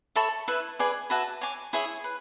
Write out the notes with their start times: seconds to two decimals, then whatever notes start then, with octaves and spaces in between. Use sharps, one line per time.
0.16 A4 C#5 E5 B5
0.48 E4 B4 E5
0.79 G#4 B4 D5 G#5
1.10 F#4 B4 E5 A5
1.41 C#5 G#5 D6
1.73 E4 G#4 C#5 E5
2.04 B4